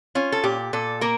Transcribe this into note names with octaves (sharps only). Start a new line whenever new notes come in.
C#4 F4
A4
A#2 G4
A#2 A4
A#3 A#4